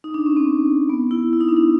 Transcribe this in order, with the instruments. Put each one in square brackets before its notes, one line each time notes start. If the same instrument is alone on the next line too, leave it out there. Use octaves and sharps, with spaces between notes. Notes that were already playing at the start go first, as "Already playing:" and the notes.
[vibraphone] D#4
D4
C#4
C4
B3
E4
E4
D#4
D4
D#4